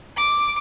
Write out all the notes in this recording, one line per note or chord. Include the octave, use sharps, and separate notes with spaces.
D6